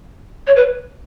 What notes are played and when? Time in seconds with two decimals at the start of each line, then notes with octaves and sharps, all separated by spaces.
0.47 C#5
0.56 B4